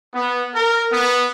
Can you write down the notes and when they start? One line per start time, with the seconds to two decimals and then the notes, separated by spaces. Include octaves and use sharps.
0.14 B3
0.54 A#4
0.91 B3